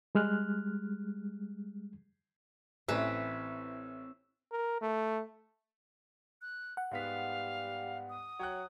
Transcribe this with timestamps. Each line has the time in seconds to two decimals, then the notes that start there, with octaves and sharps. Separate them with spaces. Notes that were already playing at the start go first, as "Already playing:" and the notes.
0.15 G3 G#3 F6 F#6
2.88 A1 E3 C4 B4 E6 E7
4.52 A#4
4.81 A3
6.42 F#6
6.77 F#5
6.91 G#2 G3 B3 F5 B6
8.10 D#6
8.39 F#3 C#5 G5 F#6